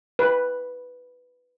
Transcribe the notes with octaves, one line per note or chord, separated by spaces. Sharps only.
B4